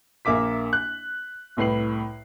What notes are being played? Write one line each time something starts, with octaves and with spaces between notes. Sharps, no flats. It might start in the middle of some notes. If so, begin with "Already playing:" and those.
A#1 A#3 E5 D6 B6
F#6
C2 A2 B4 C7 F#7